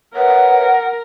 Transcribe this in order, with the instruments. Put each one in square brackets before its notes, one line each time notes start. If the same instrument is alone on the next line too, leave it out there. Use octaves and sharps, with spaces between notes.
[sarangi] A#4 [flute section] B4 C#5 E5 [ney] F#5